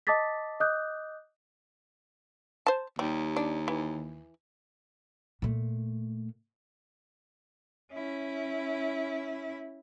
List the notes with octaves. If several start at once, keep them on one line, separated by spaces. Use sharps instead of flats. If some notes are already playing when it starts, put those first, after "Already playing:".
D#5 A5 D6 D#6 A6 B6
D#5 D6 D#6 F#6 G6
C5 A5
D#2 G3
D4
E3
A#2 A3
C#4 E4